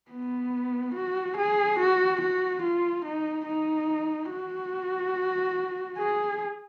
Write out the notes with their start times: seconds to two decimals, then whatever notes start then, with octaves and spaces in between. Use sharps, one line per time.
0.11 B3
0.94 F#4
1.37 G#4
1.79 F#4
2.21 F#4
2.62 F4
3.04 D#4
3.47 D#4
4.31 F#4
5.98 G#4